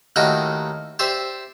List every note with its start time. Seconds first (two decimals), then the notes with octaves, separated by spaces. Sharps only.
0.16 D#2 A2 D#3 F#4 D#5 G5
0.99 G4 C5 D5 E5